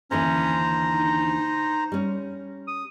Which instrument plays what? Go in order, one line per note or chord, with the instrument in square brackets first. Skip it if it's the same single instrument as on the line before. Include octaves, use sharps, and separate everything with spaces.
[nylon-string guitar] D#2 D3 E3 [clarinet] C#4 [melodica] C5 A#5
[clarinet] D#4
[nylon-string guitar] G3 C#4
[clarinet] D#6